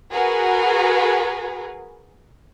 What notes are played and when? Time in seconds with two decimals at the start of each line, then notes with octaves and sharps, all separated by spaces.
0.13 F#4 G#4 A#4 B4